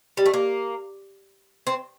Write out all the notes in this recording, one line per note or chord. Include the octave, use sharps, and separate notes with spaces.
G3
A3
A#3
C4